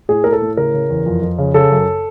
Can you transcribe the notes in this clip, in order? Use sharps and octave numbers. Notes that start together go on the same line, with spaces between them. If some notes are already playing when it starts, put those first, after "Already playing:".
A2 G#4
A2 A#4
A4
A2
C#3 A#4
C#3
E2
F2
F2
C#3
C#3 A4
F#2